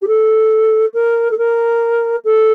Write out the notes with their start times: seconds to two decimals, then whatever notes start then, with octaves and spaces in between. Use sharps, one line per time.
0.02 G4
0.07 A4
0.94 A#4
1.31 A4
1.38 A#4
2.24 A4